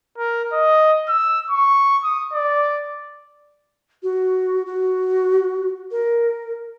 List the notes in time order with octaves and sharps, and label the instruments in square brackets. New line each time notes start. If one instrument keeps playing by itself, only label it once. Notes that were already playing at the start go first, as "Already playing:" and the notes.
[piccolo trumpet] A#4
D#5
E6
C#6
D#6
D5
[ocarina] F#4
F#4
A#4